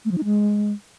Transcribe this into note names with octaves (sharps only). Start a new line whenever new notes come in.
A3
F3
D#4
G#3